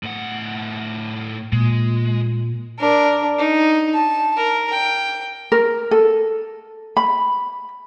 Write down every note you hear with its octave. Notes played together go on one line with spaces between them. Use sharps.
A2 F#5
A#2 G#3
D4 A#4
D#4
A5
A#4
G5
A#4
A4
B5